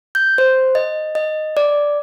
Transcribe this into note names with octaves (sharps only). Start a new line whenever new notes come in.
G6
C5
D#5
D#5
D5